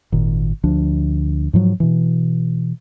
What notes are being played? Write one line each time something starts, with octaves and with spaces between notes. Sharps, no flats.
G#1 A#2 D#3
D2 F3 D4
G#2 F3 F#3
B2 E3